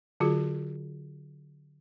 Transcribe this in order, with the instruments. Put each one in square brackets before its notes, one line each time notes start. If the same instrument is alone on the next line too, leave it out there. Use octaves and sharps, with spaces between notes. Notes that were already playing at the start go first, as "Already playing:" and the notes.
[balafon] D3 F#3 F4 F#4 G#4